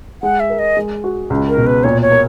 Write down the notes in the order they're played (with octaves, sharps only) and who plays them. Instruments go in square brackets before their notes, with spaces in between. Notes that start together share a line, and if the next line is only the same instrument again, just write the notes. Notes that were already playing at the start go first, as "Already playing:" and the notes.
[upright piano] G#3 [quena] F#5
[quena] E5
[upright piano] A#4
[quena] D#5
[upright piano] G#3
F#4
C#2
[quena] A#4
[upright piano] B2
[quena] B4
[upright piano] A#2 [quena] C#5
[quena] C#5
[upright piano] A#3